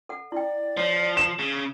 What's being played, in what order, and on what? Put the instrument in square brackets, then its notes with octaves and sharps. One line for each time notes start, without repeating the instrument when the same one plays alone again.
[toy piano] A4 F#5
[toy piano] E4 G5 [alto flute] D5
[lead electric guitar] F3 [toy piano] C#5
[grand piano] E7
[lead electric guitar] C#3